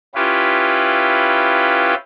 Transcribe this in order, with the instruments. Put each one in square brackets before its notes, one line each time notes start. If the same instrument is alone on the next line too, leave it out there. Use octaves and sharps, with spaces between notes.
[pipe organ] C#4 E4 F4 G4 B4